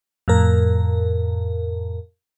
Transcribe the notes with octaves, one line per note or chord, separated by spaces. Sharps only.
F2 A2 A#4